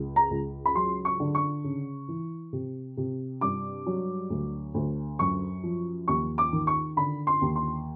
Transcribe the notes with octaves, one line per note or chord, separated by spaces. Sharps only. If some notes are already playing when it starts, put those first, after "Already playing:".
Already playing: C#2
A#5
C#2
B5
F#3 C6
C#6
D3
C#6
C#3
E3
C3
C3
G2 D6
F#3
D2
D2
F#2 C#6
F3
D#2 C#6
D6
D#3
C#6
D3 B5
C6
D#2
C6